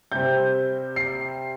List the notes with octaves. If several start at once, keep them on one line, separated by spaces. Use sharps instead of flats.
C3 G3 C4 G6
C7